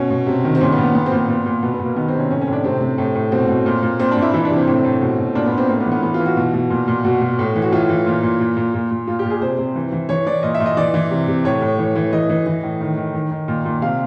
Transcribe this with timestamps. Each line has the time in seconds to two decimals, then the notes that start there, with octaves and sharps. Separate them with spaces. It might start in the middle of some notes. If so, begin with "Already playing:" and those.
Already playing: B2 C#4
0.10 B2
0.27 C3
0.44 D#3
0.55 C4
0.61 A#2 C#4
0.72 B3
0.78 A#2
0.83 B3
0.95 A#2 B3
1.06 C4
1.12 A#2
1.17 C4
1.29 A#2 B3
1.46 A#2
1.63 B2 B3
1.74 B3
1.79 B2
1.85 A#3
1.96 D#3 B3
2.08 C4
2.13 C3
2.19 C#4
2.30 A2 C#4
2.41 C#4
2.47 A2
2.53 D4
2.64 C3 C4
2.81 C3
2.98 A2
3.15 A2
3.32 B2 C4
3.49 B2
3.66 A#2
3.83 A#2
4.00 A#2 C4
4.11 D4
4.17 A#2
4.22 E4
4.34 E3 E4
4.45 D4
4.50 C3
4.56 C4
4.67 A2 C4
4.84 A2
5.02 B2
5.18 B2
5.35 A#2 D4
5.46 B3
5.52 A#2
5.58 C4
5.69 A2 A#3
5.80 B3
5.86 E3
5.92 B3
6.03 E3 B3
6.14 F4
6.20 E3
6.26 F#4
6.37 B2
6.54 B2
6.70 A#2
6.88 A#2
7.05 B2 F#4
7.22 B2
7.39 A2
7.55 E3
7.62 F#4
7.72 A2 F4
7.89 E3
8.06 A#2
8.23 A#2
8.40 A#2
8.57 A#2
8.74 A#2
8.91 A#2
9.07 A#2 F4
9.19 G4
9.25 A#2
9.30 G#4
9.41 C3 C5
9.59 C3
9.76 E3
9.92 E3
10.09 E3 C#5
10.27 E3 D5
10.43 A#2 D#5
10.55 E5
10.60 A#2
10.66 D#5
10.77 E3 D5
10.94 E3
11.11 C3
11.28 C3
11.45 A2 C#5
11.62 A2
11.79 E3
11.96 E3
12.13 E3 D#5
12.30 E3
12.46 E3
12.63 A2
12.81 D#3
12.97 D#3
13.14 D#3
13.31 D#3
13.48 A#2
13.65 A#2
13.82 C3 F5